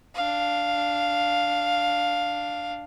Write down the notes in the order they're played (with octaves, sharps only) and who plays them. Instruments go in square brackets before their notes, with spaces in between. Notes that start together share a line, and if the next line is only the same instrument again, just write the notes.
[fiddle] D4 F5